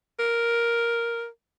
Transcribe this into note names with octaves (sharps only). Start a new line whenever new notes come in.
A#4